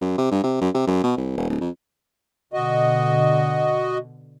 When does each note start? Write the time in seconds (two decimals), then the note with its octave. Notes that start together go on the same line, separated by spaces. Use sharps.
0.01 F#2
0.18 C3
0.31 G2
0.44 C3
0.61 F#2
0.75 C3
0.87 F#2
1.04 B2
1.17 C2
1.37 E1
1.49 D1
1.61 F2
2.53 B2 D3 F#4 D#5